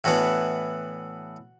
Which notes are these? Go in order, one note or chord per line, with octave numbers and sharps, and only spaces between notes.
A2 E3 B3 D4 F#4